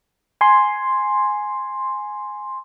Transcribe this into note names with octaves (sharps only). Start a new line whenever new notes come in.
G#5 C6